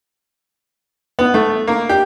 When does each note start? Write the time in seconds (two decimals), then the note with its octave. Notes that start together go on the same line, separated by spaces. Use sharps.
1.19 B3
1.34 A3
1.67 A#3
1.89 G4